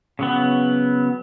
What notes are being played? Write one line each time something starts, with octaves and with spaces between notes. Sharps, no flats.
C#3 F#3 B3